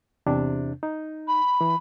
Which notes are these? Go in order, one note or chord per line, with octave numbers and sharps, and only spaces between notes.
E2 C3 D4
D#4
B5
E3